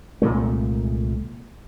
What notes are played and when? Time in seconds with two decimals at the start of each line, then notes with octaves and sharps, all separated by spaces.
0.22 C2 A#2 G#3 A3